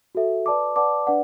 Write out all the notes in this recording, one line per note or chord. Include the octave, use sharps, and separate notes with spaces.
F#4 A4 E5
B4 D5 A5 D6
B4 D5 F#5 A5 D6
D4 B4 D5 F#5